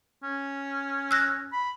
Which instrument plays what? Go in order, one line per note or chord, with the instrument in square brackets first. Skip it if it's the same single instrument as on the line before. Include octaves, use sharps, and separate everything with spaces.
[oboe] C#4
[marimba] E6 F#6 A#6
[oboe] B5